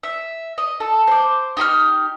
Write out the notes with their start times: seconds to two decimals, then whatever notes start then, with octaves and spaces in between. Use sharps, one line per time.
0.03 E5
0.58 D#5
0.80 A4
1.07 C5 D6
1.57 D#4 G4 B5 F6